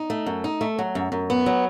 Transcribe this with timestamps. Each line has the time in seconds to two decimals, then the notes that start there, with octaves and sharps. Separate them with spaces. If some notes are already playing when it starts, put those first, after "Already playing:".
Already playing: D#4
0.10 A3
0.26 F#2
0.44 D#4
0.61 A3
0.78 F#3
0.95 F#2
1.12 F#2
1.30 B3
1.46 F#3